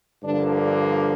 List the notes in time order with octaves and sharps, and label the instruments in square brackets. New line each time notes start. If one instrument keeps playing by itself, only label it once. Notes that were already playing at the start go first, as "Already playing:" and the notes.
[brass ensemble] G2 D3 F3 A#3 D4